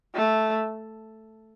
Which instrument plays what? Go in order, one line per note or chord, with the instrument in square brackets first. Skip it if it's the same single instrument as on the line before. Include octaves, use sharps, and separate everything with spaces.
[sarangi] A3